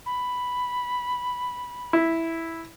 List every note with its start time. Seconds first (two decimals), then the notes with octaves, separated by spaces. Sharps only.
0.06 B5
1.93 E4